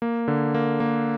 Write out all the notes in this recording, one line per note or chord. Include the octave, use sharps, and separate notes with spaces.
A#3
D3
A#3
A#3